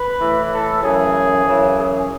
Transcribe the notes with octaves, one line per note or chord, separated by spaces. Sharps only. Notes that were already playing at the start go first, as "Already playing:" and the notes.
Already playing: B4
A2 E3
A4
F#2 C#3 E3 G#4
F#2 C#3 E3
G#4